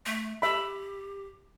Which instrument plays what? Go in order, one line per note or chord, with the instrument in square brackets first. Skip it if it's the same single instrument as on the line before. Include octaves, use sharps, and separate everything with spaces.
[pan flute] A3
[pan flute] G4 [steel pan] E5 B5